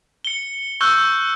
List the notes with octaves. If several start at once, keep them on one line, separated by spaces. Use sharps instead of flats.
C#7 G7
C#6 E6 F#6 G6 G7